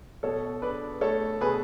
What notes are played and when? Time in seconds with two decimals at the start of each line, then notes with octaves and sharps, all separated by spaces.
0.23 B2 A4 C#5
0.62 D4 B4 D5
1.01 A3 A4 C#5
1.41 B2 G#4 B4